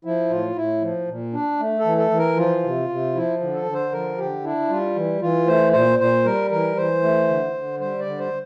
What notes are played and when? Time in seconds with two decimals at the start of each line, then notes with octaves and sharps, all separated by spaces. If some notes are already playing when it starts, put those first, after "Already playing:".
0.05 F3 E4
0.30 A2 F4
0.56 A2 E4
0.82 F3
1.08 A#2
1.33 D4
1.59 A3
1.79 A4
1.85 E3
1.98 A4
2.11 E3
2.18 A#4
2.37 F3 F4
2.63 C3
2.89 C3
3.15 F3 E4
3.41 D3
3.54 A4
3.66 D3
3.73 C5
3.92 F3 A#4
4.18 D3 G4
4.43 D4 E4
4.69 G3 F4
4.96 E3
5.21 E3 F4
5.47 A3 C5
5.73 A#2 C5
5.99 A#2 C5
6.25 G3 A#4
6.50 E3 A#4
6.77 E3 C5
7.03 A3
7.28 D3
7.54 D3
7.80 G3 C5
7.99 D5
8.06 D3
8.18 C5